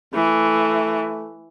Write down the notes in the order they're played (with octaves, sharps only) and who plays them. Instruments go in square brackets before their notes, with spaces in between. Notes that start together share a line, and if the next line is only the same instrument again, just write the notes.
[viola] E3 [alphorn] A3